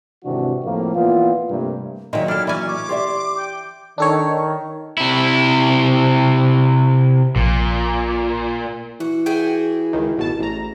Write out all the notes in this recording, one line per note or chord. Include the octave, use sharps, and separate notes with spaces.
G#1 C3 E3 D4 F#4
F2 A2 F3 A#3
A#2 E3 B3 F4
G2 C3 A3 A#3
A#2 D#3 F#3 G#3 E5
D4 E4 A4 F6
E3 C#4 D5 G#5
C#5 D6
G4 D5 E5 C6
G5
D#3 D4 A4 C#5
C3 E4
A#1 A#2
E3 F#4
E4 F#4 G#4 G5
C#2 D#3
A1 B2 A5
A1 A#5